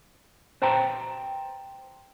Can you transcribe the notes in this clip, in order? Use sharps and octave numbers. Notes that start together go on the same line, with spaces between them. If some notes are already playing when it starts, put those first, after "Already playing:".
B4 C5 G5 A5 A#5